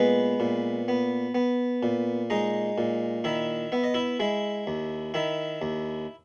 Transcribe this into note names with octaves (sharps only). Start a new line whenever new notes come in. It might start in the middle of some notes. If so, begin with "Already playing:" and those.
Already playing: A#2 G#3 B3 B4
A#2
B3
B3
A#2
G#3 D#4 D#5
A#2
D#3 E4 E5
B3 E5
D#5
E4 E5
G#3 E4 E5
D#2
D#3 E4 E5
D#2